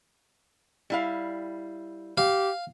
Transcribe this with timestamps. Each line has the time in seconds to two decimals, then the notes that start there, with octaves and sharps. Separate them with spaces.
0.90 G3 E4 F5
2.18 G4 F5